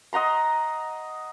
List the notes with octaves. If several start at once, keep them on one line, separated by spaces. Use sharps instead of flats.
D#5 F#5 A#5 C6